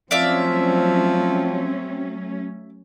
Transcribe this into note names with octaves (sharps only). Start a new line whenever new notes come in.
F3 F#3 A3 C4 C#4 D5 E5 F5